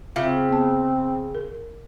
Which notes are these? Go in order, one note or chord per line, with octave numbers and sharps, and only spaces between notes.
C#3 C4 F4 E5 F5
B3 A5
A#4